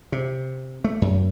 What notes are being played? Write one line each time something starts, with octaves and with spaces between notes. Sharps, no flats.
C3
A3
F#2